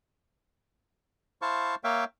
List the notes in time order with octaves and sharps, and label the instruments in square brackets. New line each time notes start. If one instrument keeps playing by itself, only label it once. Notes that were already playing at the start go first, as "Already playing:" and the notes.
[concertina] E4 C5 F5 A5 C#6
A#3 C#5 E5 F5 G5